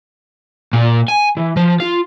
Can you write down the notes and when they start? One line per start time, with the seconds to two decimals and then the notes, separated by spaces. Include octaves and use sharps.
0.73 A#2
1.08 G#5
1.37 E3
1.57 F3
1.80 F4